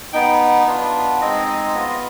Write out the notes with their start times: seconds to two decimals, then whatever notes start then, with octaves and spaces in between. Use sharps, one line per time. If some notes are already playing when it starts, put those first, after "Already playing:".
0.13 B3 D#4 G5
0.67 B3 D4 F4
1.21 G#3 C4 D#4 D#5
1.74 B3 F4